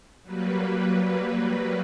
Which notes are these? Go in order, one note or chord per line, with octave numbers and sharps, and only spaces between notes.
F#3 G3 A#3 B4